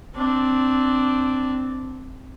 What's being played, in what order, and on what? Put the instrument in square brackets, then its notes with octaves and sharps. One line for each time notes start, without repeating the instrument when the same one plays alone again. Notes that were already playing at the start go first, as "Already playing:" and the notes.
[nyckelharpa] C4 D4